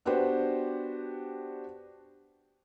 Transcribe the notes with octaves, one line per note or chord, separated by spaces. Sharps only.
B3 D4 F#4 G4 B4 C5